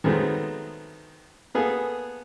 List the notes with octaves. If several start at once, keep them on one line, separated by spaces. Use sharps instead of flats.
D#3 F#3 G#3 A3 B3 C4
A#3 B3 G#4 A4